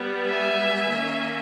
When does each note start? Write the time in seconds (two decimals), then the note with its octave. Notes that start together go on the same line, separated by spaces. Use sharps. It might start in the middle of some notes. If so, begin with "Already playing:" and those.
Already playing: G3 B3
0.26 E5 G#5
0.91 D#3 A#3 C#4